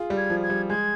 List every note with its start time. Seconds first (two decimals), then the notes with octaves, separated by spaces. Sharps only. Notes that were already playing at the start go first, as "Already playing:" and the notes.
Already playing: F4 G#4
0.10 G3
0.17 G#6
0.30 F3
0.43 G#6
0.50 G3
0.70 G#3 G#6